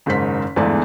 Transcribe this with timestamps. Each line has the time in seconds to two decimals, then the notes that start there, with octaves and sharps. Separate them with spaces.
0.06 F#1 G#2 D#3 C5 B6
0.56 G1 E2 G#2 E3 A3 D5